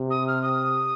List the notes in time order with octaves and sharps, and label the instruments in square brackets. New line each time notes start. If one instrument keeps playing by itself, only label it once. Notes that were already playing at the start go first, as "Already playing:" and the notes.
Already playing: [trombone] C3
[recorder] D#6
F6
D#6